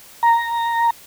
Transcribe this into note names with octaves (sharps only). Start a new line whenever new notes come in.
A#5